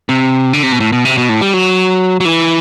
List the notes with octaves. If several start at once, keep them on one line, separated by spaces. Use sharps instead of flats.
C3
D3
C3
B2
A2
B2
C3
B2
A2
G3
F#3
F#3
E3